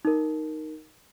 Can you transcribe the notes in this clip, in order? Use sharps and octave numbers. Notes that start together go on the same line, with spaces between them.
D#4 A#4